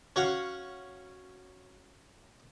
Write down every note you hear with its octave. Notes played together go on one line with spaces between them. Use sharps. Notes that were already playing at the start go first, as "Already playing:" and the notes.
C#4 F#4 F5 F#5